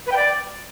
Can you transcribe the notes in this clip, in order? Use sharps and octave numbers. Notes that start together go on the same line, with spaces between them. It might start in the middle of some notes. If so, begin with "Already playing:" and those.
B4
G5
D5